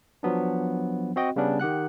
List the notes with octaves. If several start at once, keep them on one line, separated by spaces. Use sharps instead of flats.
F3 F#3 B3 D4
C4 F#4 D#5 G5
C#3 G3 B3 C#4 D4
D#3 G4 F#5 F#6